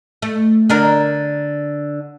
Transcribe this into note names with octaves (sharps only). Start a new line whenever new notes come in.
A3
D3 D4 A#4